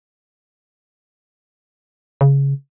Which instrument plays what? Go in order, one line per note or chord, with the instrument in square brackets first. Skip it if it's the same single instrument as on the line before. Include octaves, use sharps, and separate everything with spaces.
[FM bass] C#3